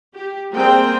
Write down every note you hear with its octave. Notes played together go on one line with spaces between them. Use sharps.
G4
G3 A#3 C4 G#4 C5 G5